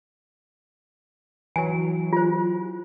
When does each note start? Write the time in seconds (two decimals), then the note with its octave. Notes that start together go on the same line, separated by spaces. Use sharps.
1.56 E3 F#3 G#5
2.13 F4 C5